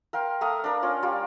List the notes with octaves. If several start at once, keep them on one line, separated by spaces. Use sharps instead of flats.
A#4 F5 G5 C6
A3 F5 A#5 D#6
D4 A#4
C#4 F4
G3 F4 D5 F5